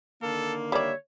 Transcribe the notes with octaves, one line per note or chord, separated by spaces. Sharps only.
D3 D#3 A#3 A4
G3 C#5 D5 E5